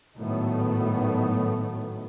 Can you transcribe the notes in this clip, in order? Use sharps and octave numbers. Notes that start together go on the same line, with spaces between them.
G#1 A2 D#3 F#3 A3 B3